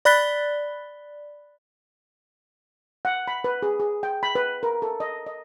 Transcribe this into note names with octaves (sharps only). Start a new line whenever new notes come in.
D5 B5 F#6 A6 B6 G7
F#5
B5
B4
G#4
G#4
G5
B5
B4
A#4
A4
D#5
D#5